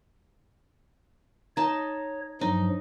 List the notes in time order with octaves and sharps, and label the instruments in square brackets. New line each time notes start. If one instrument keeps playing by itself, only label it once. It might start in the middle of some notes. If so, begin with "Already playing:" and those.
[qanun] D#4 A5 [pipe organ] C#5
[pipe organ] G2 F3 F#3 [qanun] D#4